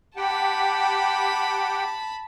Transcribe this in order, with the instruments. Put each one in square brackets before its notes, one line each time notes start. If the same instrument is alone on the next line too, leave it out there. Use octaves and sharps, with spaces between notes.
[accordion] G4 F#5 G5 [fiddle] A5 B5